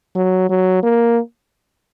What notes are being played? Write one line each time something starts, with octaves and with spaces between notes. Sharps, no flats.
F#3
F#3
A#3